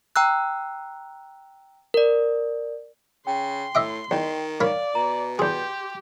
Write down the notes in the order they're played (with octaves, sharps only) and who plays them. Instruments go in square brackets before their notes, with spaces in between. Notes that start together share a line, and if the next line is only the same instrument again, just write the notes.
[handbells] G5 A#5 E6 F#6
A#4 D5
[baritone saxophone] C#3 [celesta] G5 [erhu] C6
[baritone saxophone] A2 [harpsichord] D#5 E5 D6
[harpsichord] E2 [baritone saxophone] D#3 [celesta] D#5 G5
[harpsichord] A#4 C#5 B5 [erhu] D5 [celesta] F5
[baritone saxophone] B2 [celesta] A#5
[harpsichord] E2 G#4 [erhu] G4 [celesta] C6 G6